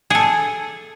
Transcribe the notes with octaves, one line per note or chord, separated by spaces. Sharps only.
G#4 A4